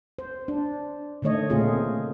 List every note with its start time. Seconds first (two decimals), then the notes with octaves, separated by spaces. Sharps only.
0.19 C5
0.48 D4
1.22 D3 D#3 A3 C#5 D#5
1.50 A#2 C#3 A3 C4 F4 G#4